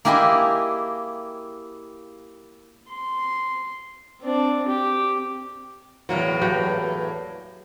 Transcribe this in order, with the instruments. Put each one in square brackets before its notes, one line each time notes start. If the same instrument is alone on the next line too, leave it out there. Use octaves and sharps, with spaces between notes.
[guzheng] A#3 E4 G4 G#4 D#5 C6
[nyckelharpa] C6
C4 D4
G4
[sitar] E2 A2 A#3 [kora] F#3
[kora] F#3 G4 B4